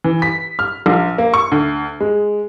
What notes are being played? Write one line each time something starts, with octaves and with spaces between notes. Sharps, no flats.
E3
B6
F6
A#1
A#3
C#6
D2
G#3